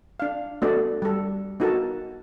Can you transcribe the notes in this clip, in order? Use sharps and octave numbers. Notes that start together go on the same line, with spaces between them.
D4 F5
A3 B3 D4 F#4 D5 D#5
G3 A4
B3 D#4 F#4 A4 A#4 A5